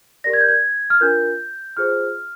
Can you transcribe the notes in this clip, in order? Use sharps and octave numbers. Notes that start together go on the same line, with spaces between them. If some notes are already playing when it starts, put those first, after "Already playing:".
G4 A#4 D5 A#6
G#6
G6
G#6
F6
D4 F4 A#4 G6
F4 G#4 C5 F6